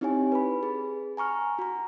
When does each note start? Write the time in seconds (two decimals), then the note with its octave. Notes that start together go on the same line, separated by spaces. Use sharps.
0.01 C4 D#4 E4 G4 C#5 G#5
0.32 B4 B5
0.63 G#4
1.17 G#5 A#5 C#6 F6
1.59 F#4 A#5